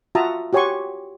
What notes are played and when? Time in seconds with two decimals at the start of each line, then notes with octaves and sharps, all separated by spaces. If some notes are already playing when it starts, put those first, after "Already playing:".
0.15 F4 F#4 E5 A5 A#5 D#6
0.53 F#4 G4 C#5 G#5 C6 C#6